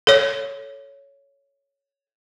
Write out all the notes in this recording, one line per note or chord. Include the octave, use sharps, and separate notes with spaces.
A4 C#5